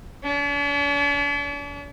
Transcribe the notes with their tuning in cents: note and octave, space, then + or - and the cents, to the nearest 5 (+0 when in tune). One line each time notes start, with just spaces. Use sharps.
D4 -45